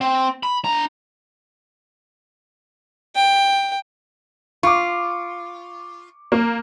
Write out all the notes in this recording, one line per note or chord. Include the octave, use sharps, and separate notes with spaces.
C4
B5
D4 A#5
G5
F4 C#6 D6
A#3